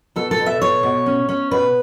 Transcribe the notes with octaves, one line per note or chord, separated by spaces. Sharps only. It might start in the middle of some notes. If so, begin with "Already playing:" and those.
B2 A4
A4
B2
E5
B2 C#5
B2
C#4
C#4
B2 B4